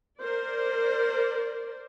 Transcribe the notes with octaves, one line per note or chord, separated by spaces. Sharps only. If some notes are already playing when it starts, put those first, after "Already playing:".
A#4 C5 D5